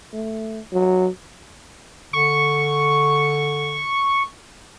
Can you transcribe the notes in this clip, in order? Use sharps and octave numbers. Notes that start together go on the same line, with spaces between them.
A3
F#3
D3 C#6